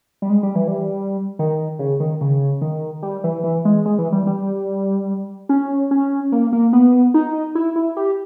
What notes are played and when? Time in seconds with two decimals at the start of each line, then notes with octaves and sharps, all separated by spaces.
0.22 G3
0.30 G#3
0.43 G3
0.55 E3
0.68 G3
1.39 D#3
1.79 C#3
2.00 D#3
2.21 C#3
2.62 D#3
3.03 G3
3.24 E3
3.44 E3
3.65 G#3
3.85 G#3
3.98 E3
4.12 G3
4.27 G3
5.49 C#4
5.91 C#4
6.32 A#3
6.53 A#3
6.73 B3
7.14 D#4
7.55 E4
7.76 E4
7.97 G4